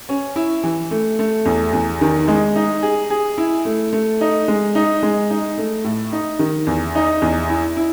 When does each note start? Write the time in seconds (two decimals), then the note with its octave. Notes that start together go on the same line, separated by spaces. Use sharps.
0.09 C#4
0.36 E4
0.63 E3
0.91 A3
1.19 A3
1.45 E2
1.73 E2
2.01 D#3
2.28 G#3
2.56 D#4
2.82 G#4
3.10 G#4
3.38 E4
3.65 A3
3.93 A3
4.21 D#4
4.48 G#3
4.75 D#4
5.03 G#3
5.30 D#4
5.58 A3
5.84 A2
6.12 D#4
6.39 D#3
6.67 E2
6.95 D#4
7.22 E2
7.49 E4
7.77 E4